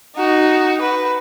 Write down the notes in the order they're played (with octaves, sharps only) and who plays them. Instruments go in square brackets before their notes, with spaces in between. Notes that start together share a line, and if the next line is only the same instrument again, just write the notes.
[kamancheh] D#4 F#4
B4